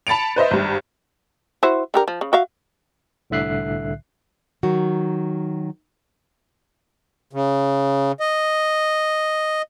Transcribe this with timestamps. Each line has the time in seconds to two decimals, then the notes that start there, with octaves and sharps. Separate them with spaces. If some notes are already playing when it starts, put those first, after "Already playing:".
0.07 A5 B5 A6 C#7 D7 F7
0.36 B4 C5 D#5 E5
0.51 G#1 G2
1.63 E4 F#4 C5
1.94 D3 G4 A#4
2.08 F3
2.21 C#3
2.33 F#4 E5 F5
3.30 C2 A2 D3 E5 F#6 C7
4.63 D#3 F#3 F#4
7.33 C#3
8.20 D#5